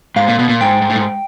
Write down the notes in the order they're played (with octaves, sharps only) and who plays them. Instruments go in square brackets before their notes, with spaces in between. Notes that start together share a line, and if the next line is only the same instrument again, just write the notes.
[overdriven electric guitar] G#2 [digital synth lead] F5
[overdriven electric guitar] A#2
B2
A#2
[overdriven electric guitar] G#2 [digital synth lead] G5
[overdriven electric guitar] G#2
A2
G#2